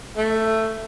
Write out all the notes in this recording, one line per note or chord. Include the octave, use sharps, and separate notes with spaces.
A3